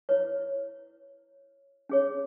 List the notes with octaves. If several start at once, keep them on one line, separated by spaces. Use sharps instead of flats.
E4 B4 C#5
C#4 G#4 C#5